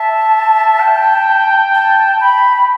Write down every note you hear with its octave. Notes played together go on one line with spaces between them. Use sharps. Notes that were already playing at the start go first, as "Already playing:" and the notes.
Already playing: E5 A5
G5
A5
B5